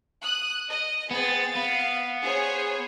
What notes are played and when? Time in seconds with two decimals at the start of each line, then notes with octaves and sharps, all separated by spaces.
0.22 D#6 F#6
0.69 D#5
1.11 B3 C4 G#4 A6
1.55 B3 F5
2.23 G#4 C5 C#5